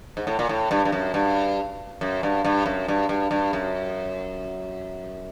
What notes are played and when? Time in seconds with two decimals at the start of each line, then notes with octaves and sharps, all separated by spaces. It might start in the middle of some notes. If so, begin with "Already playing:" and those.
0.17 G#2
0.27 A2
0.39 A#2
0.49 A2
0.71 G2
0.85 G2
0.92 F#2
1.14 G2
2.01 F#2
2.23 G2
2.45 G2
2.66 F#2
2.88 G2
3.09 G2
3.31 G2
3.53 F#2